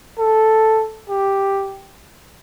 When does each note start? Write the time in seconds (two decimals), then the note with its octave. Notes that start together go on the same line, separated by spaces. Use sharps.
0.19 A4
1.09 G4